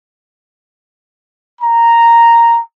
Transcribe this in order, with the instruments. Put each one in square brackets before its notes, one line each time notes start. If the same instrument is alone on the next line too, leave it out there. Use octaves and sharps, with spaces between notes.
[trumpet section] A#5